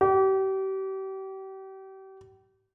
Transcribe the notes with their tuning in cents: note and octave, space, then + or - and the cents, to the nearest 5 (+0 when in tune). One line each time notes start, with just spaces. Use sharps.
G4 -35